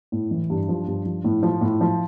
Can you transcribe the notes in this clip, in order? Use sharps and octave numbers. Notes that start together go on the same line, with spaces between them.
A2
E3
G2
F3
G2
F3
A2
F3
A2
F3